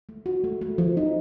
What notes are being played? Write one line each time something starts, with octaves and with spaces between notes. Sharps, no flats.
A3
F#4
A3
A3
F3
D#4